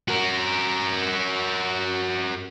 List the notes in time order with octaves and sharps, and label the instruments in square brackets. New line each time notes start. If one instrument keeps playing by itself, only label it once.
[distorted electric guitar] F#4 A#4